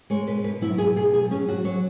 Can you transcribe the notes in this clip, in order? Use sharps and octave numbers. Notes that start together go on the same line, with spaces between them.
G#3 C#5
B2 B4
B2 B4
F#3 E4
B2 G#4
B2 G#4
F#3 G#4
F#3 C#4
F#3 F#4
F#3 C#5